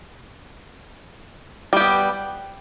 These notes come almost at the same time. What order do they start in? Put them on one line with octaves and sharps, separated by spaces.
G3 G4 B3